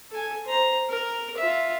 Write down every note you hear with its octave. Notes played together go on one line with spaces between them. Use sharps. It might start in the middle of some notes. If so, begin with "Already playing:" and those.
A4 G#5
C5 A#5
A#4
F4 E5